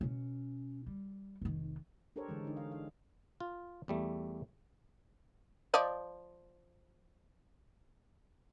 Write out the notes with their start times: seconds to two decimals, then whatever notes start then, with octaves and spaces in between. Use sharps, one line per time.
0.01 B2 C#4
0.87 G3
1.42 F1 D#3
2.16 D4 G4 A4 A#4 C5 C#5
2.28 D3 E3 G#3
2.44 D3 D#4
2.57 F5
2.71 F5
3.40 F4
3.88 E2 G3 A3
5.74 F3 D5 D#5